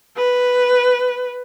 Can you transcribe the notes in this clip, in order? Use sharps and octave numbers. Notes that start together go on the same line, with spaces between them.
B4